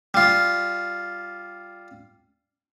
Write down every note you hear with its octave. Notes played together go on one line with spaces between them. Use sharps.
G3 F4